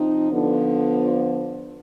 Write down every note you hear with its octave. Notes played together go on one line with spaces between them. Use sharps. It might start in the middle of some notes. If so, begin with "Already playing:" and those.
Already playing: C3 F3 C4 D#4
D3 F3 B3